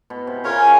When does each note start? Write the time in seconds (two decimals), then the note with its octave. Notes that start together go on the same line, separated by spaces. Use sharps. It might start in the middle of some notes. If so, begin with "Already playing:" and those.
0.10 B2
0.27 C3
0.44 C#3 C#4 F4 A#4 C#5